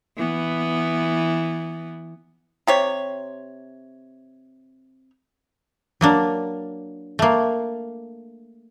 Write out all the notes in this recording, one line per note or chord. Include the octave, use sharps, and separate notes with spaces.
E3 B3
C3 G4 C#5
F#3 A#3 D4
A3 A#3